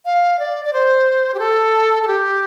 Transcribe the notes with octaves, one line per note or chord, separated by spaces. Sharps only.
F5
D5
D5
C5
G4
A4
A4
G4